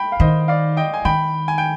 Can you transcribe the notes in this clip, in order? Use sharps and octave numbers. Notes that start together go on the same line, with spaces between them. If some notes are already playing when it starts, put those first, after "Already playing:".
Already playing: G5 B5
F5
D#3 C5 D#5
D5 F5
D#5 G5
G#5
D#3 G5 B5
G#5
G5